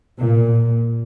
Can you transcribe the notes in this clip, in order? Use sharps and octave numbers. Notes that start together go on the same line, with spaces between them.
A#2